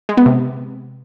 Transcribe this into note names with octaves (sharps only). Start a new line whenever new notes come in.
G#3
B3
C3